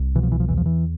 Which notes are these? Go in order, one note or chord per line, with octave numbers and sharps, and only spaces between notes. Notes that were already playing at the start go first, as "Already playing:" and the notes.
Already playing: C2
B2 E3
F3
E3
F3
E2 E3
F3
E3